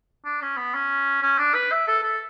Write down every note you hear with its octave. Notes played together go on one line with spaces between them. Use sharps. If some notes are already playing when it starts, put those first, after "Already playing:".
D4
C#4
B3
C#4
C#4
D4
B4
E5
A4
A4